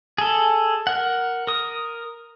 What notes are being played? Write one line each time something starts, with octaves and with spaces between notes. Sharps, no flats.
G#4 A4
A#4 F#5
A#4 D#6